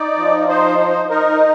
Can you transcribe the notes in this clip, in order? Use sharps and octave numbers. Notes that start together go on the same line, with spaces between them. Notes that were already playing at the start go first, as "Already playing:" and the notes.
Already playing: D#4 D5
F3
D#4 C5
D#4
D#4 A#4